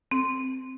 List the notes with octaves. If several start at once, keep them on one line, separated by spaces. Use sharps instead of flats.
C4